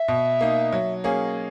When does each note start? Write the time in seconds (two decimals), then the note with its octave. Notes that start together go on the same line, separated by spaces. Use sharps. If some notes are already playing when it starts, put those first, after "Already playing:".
Already playing: E5
0.08 B2
0.41 A#3 D#4
0.72 F#3
1.04 A#3 C#4 G#4